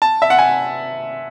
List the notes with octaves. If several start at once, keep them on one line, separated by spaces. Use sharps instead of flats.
A5
E5
F#5
G#5